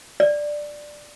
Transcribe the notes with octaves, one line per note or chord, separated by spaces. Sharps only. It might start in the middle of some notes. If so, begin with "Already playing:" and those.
D5